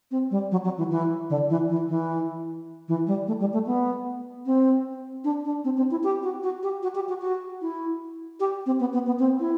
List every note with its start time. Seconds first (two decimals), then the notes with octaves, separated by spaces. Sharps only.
0.11 C4
0.31 G3
0.51 F#3
0.64 F#3
0.78 E3
0.91 E3
1.29 D3
1.50 E3
1.69 E3
1.89 E3
2.88 E3
3.07 G3
3.27 A3
3.40 G3
3.53 A3
3.66 B3
4.46 C4
5.24 D4
5.45 D4
5.64 C4
5.77 C4
5.91 E4
6.04 G4
6.23 F#4
6.43 F#4
6.63 G4
6.83 F#4
6.95 G4
7.09 F#4
7.21 F#4
7.61 E4
8.40 G4
8.66 C4
8.80 B3
8.93 B3
9.06 B3
9.19 C4
9.40 E4